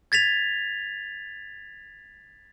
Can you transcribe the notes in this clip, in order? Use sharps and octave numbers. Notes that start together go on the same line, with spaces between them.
G#6 A6 B6 F7